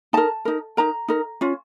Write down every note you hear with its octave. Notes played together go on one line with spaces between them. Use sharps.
D#4 A#4 A5
D#4 A#4
D#4 A#4 A#5
D#4 A#4
C#4 F4